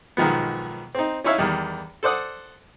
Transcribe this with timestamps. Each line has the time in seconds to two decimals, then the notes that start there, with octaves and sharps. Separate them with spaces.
0.17 B1 G#2 D#3 F3 B3
0.95 C4 D#4
1.24 C#4 D#4 E4 C#5 E5 F5
1.38 E2 D#3 G3
2.03 A4 C5 D5 F#5 D#6